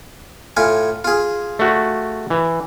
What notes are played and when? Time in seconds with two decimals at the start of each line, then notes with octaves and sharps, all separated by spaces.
0.57 A2 F4 G#5
1.04 F4 G#4
1.59 A3 F#4
2.30 E3